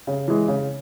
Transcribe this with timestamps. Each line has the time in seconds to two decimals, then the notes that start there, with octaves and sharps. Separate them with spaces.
0.07 C#3
0.28 E3 G#3
0.48 C#3